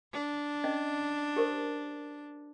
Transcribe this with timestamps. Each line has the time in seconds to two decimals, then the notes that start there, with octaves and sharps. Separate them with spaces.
0.13 D4
0.64 C#4 D#5
1.36 G4 A#4 C5